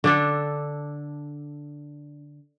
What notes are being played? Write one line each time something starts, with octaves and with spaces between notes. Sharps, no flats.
D3 D4 A4